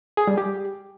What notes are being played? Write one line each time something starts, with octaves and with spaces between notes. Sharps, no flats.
G#4
G3
G4